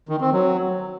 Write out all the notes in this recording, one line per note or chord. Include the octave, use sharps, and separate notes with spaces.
D#3
C4
F#3